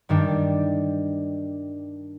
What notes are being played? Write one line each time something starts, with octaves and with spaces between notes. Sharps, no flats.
G2 D#3 G3 D4 G4